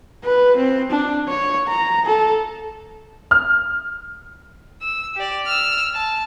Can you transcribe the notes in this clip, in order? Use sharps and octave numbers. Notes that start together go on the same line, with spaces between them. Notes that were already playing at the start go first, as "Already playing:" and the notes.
B4
C4
D4
C#5
A#5
A4
F6
E6
G4 D5
E6 F6
A5